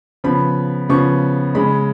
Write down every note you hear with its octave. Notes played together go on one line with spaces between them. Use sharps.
C#3 F3 B3 B5
C#3 F3 B3 C#6
C#3 G#3 C#4 B5